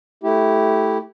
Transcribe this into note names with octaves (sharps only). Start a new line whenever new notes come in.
A3 E4 G4